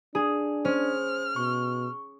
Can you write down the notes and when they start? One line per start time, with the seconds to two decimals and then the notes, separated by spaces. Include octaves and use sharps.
0.15 D4 G#4
0.65 C#4 C5 F6
1.36 B2 C#6